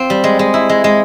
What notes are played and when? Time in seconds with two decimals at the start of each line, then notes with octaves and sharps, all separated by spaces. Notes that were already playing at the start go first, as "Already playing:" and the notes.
Already playing: C4 F4
0.10 G3
0.24 G#3
0.39 G#3
0.54 E4
0.69 G#3
0.84 G#3